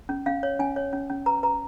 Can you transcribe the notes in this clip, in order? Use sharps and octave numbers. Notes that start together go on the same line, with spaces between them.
C#4
C#4 F5
C#5
C#4 G#5
C#5
C#4
C#4
B4 A#5
B4 A#5